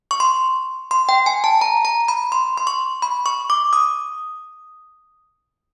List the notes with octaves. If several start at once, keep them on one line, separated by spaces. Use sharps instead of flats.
C#6
C6
C6
G5
G#5
A5
A#5
A#5
B5
C6
C6
C#6
B5
C#6
D6
D#6